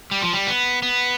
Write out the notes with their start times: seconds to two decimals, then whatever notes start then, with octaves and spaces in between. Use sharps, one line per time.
0.11 G3
0.22 F3
0.33 G3
0.47 B3
0.82 B3